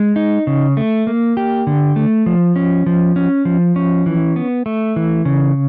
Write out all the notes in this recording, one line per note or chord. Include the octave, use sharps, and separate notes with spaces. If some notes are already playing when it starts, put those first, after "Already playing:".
Already playing: G#3
D#4
C#3
A3
A#3
G4
D3
A3
F3
C#4
F3
C#4
F3
C#4
E3
B3
A3
E3
C#3